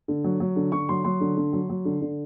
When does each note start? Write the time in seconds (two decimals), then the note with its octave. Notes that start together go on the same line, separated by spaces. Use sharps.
0.08 D3
0.24 F#3
0.40 F#3
0.56 D3
0.72 D3 C#6
0.89 F#3 C6
1.04 F#3 C6
1.21 D3
1.37 D3
1.53 F#3
1.69 F#3
1.85 D3
2.01 D3